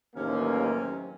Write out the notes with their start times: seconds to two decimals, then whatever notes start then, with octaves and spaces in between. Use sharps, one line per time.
0.16 A1 D#2 C3 F#3 A#3 C#4